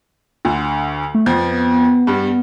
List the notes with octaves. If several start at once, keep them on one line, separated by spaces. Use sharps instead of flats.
D2 D3
A3
F2 F3 B3
G2 G3